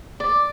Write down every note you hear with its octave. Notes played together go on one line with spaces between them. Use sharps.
D5